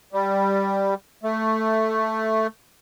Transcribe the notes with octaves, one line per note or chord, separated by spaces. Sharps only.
G3
A3